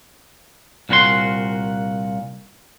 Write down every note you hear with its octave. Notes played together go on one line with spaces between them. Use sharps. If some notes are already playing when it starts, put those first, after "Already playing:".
C2 A#2 F#4 G4 C6